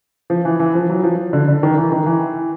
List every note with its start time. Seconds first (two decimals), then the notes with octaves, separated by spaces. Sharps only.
0.30 F3
0.45 E3
0.60 E3
0.75 F3
0.89 F#3
1.04 F3
1.33 D3
1.48 D3
1.63 D#3
1.78 E3
1.92 D#3
2.06 E3